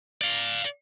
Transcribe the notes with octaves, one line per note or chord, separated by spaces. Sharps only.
D5 F5